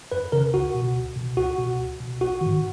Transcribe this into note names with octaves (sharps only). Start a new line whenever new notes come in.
F2 B4
C#3 A#4
C#2 F#4
B2
C#2
B2
C#2 F#4
B2
C#2
B2
A#1 F#4
G#2 D#3